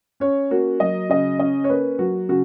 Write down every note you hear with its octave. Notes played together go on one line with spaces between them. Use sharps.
C#4 C#5
A#3 F#4
F#3 D#5
C#3 D#5
C#4 D#5
C#5
A#3 B4
F#3 F#4
C#3 F#4